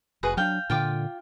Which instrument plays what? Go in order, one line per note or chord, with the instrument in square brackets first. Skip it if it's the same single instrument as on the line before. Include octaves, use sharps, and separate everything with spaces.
[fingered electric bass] F1 [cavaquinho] F#4 G#4 B4
[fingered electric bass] F#3 D4 [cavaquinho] F5 G5
[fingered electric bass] A#2 D3 [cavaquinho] F4 G5 D6